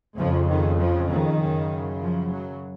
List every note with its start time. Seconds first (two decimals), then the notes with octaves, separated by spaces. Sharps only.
0.17 F2 C#3 F3
0.48 D#3
0.79 F3
1.09 D#3
1.40 F#2 C#3
2.01 F3
2.32 F#3